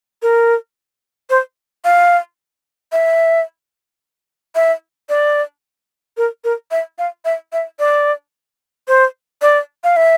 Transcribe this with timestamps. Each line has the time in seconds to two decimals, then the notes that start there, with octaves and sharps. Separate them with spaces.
0.22 A#4
1.30 C5
1.85 F5
2.92 E5
4.55 E5
5.09 D5
6.17 A#4
6.44 A#4
6.71 E5
6.99 F5
7.25 E5
7.53 E5
7.79 D5
8.88 C5
9.42 D5
9.84 F5
9.96 E5